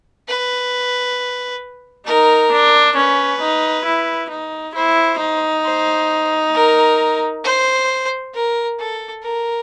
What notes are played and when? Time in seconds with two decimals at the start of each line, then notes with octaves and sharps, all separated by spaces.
0.28 B4
2.07 D#4 A#4
2.52 D4
2.96 C#4 B4
3.41 D#4
3.86 E4
4.30 D#4
4.75 E4 C5
5.21 D#4
5.64 C5
6.54 A#4
7.44 C5
8.34 A#4
8.79 A4
9.23 A#4